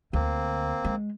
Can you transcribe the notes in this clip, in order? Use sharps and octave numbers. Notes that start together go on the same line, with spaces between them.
D2 A#3 C4
G#3